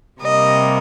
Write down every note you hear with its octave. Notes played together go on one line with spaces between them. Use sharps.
C3 G3 A#3 D#5